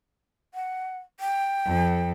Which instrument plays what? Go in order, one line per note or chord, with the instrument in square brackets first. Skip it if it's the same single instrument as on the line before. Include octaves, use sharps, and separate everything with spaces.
[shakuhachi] F#5
G5
[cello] F2 A4